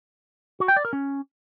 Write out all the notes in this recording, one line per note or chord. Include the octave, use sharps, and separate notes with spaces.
F#4
G5
D5
A#4
C#4